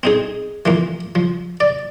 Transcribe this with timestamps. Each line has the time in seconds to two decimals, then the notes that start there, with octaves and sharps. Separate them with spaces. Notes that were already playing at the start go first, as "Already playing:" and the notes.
0.03 C4 D#4 G#4
0.66 E3 F3 A#3
1.15 F3
1.60 D5